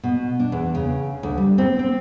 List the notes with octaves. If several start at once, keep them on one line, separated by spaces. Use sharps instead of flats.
B2
D4
E2
C#3
D2
G3
C4
C4